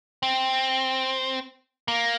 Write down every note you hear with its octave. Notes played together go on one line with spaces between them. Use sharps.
C4
A#3